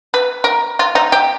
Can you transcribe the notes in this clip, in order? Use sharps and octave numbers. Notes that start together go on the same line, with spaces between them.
B4
A#4
F4
D#4
G4